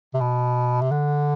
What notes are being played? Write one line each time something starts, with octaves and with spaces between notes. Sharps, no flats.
C3
B2
C3
D3